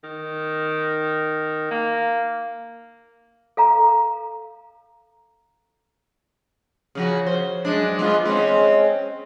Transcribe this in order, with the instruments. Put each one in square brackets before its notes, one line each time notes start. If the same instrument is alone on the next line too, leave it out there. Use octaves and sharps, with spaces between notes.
[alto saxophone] D#3
A#3
[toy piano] A4 F5 A#5
[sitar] C#3 F3 F#4
C5
F#2 G#3 D4
G#3 B3 F4
G#3 C4 C#4